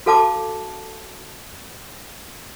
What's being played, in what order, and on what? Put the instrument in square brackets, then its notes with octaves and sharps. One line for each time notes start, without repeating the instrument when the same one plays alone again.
[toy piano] F#4 A4 F5 A5 D6